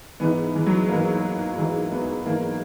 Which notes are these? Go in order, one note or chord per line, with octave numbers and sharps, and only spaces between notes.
G#2 E3 B3
E3
F#3
G#3
G#2 E3 A#3
G#2 E3
B3
G#2 E3 A#3